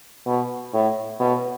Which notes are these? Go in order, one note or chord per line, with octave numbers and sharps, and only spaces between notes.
B2
A2
B2